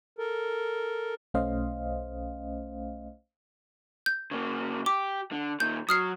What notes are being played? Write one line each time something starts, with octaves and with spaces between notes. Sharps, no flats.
A4 A#4
B1 A3 C#4 C5 D#5 F5
G6
C#3 A#3
G4 D6
D3
A#2 D#3 G6
F#3 D#6 F6 C7